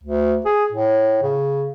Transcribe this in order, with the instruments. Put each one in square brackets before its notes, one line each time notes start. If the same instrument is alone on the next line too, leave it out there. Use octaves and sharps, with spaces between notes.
[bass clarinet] D2
G#4
A2
C#3